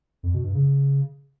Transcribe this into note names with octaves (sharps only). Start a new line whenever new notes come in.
F2
B2
G2
C#3